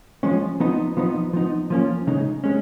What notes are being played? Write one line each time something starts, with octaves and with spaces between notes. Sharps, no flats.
F3 G#3 C#4
F3 B3 D#4
F3 B3 D#4
F3 B3 D#4
F3 A#3 C#4
C#3 G#3 D#4
G#3 C#4